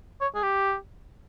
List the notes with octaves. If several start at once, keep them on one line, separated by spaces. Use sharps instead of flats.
C#5
G#4
G4